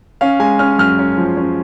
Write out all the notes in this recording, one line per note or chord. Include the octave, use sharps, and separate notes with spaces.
C#4 F5
G#3 G#5
C#4 F6
F#2 F6
C#4
F3
C#4